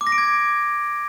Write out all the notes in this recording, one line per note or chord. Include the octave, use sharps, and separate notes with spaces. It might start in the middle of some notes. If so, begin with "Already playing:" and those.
D6
A#6
D7
G#6